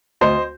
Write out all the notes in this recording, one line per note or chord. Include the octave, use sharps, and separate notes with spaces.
D2 C5 D#5